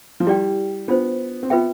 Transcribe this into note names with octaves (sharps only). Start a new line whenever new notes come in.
F3
G3 E4 G4 D5 G5
B3 D4 F4 C5
C4
B3 F4 B4 E5 G5